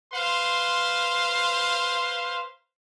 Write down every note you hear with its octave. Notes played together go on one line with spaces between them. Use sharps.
B4 C5 F5 C6